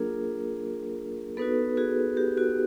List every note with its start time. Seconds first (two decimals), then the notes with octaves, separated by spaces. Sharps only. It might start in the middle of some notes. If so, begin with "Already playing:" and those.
Already playing: F#3 A#3 D4 F4 G#4 A#4
1.37 B3 D#4 F#4 A4 B4
1.77 F#4 G#4
2.17 G4
2.37 F#4